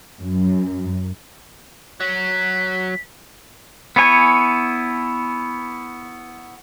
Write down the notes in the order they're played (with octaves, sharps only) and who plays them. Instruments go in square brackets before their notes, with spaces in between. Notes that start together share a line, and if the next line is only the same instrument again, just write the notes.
[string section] F#2
[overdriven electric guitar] F#3 [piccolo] B6
[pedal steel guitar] B3 E4 C#5 G#5